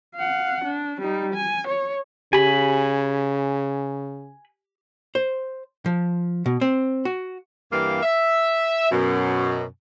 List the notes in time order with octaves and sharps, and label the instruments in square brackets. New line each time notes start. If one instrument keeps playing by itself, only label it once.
[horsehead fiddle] F5 F#5
D4
G3 D#4
G#5
C#5
[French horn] C#3 [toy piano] G4 [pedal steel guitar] G#5 B5
[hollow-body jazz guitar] C5
F3
B2
C4
F#4
[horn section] G2 E3 A#3 G4 F5
E5
F#2 B2